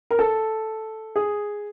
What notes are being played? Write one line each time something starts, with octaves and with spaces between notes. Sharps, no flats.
A#4
A4
G#4